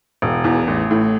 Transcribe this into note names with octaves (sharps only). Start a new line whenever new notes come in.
E1
E2
A1
A2